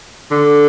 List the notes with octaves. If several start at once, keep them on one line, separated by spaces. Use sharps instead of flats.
D3